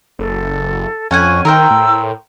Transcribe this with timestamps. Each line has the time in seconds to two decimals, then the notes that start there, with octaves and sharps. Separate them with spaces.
0.19 F#1 A4
1.11 F2 C#4 F#5 G#5 C#6
1.45 D#3 A#4 C5 G5 E6
1.70 A2